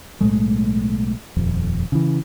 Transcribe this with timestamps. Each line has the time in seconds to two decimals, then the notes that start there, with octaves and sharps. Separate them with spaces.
0.20 B1 A2 G#3 A3
1.37 D#1 F2
1.92 C#3 E3